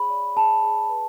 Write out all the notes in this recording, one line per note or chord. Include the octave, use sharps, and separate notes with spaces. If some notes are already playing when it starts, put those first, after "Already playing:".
Already playing: G#4 C#5 B5
D5
G#4 A5
G#4
B4